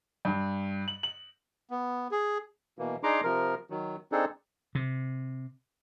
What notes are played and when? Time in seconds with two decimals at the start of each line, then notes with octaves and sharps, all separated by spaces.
0.25 G2
0.88 F#7
1.03 F#7
1.71 B3
2.11 G#4
2.79 B2 E3 A#3
3.03 D4 D#4 G#4 A#5 C6 D6
3.24 C3 F3 A#4
3.70 D#3 F#3
4.12 C4 D4 D#4 G#4 A4
4.75 C3